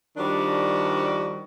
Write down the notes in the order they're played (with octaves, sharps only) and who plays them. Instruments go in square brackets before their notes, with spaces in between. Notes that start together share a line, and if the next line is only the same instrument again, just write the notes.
[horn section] D#3 F3 G3 D4 F#4